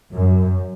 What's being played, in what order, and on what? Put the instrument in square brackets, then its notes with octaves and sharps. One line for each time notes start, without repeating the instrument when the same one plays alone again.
[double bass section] F#2